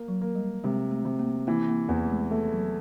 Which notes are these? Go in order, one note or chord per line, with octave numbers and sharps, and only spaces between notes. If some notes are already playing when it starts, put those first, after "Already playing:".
Already playing: A#3
F#3
A#3
G3
C3 G#3
A3
C3
A#3
E3 A#3
A#3
E2 A#3
A3
G#3
A3
F#3